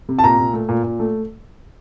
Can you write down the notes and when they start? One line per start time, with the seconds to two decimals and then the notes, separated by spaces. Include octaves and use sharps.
0.09 C3
0.19 A5
0.24 A#2 A#5
0.38 A#2
0.53 A3
0.68 A#2
0.83 A#2
0.99 A3